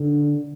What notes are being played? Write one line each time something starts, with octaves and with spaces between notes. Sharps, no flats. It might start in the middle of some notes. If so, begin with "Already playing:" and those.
Already playing: D3